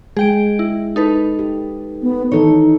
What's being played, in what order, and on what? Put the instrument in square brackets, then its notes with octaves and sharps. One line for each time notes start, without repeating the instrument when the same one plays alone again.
[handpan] G#3 [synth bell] G#4 G5 D7
[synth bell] E4
D#4 A4 B4
[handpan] G4
[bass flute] B3
[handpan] D#3 E3 A4 [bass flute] D#4 [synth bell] C#5